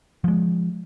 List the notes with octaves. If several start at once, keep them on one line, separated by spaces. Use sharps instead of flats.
F3 G#3